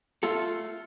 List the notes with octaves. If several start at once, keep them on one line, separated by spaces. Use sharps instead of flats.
A3 F4 A4